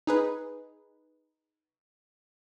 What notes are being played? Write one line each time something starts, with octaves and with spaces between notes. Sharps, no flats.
D#4 G#4 B4